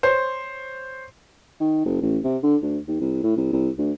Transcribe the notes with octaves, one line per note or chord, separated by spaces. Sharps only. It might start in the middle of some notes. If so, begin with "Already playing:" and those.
C5 C#5
D#3
F#1
A1
C3
D3
D2
D#2
C2
A2
C2
C2
D2